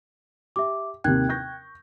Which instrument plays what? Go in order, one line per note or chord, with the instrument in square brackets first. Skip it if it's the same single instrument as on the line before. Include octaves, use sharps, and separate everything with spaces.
[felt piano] G4 [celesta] E5 D6
[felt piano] D#2 C3 [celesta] G5 F#6 G#6
[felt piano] C#6 G6 A#6